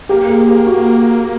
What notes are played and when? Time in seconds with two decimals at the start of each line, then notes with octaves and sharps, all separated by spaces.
0.09 A#3 G4
0.28 G#4
0.47 G4
0.67 F#4